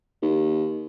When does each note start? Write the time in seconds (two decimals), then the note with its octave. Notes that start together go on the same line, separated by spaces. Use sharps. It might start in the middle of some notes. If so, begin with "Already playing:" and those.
0.22 D#2